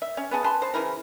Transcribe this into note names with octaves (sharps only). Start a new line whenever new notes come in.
E5
C#4
B3 C#4 G#4 A5
B4 G#5 A5 C6
C5 A5
C#3 E3 E4 A#4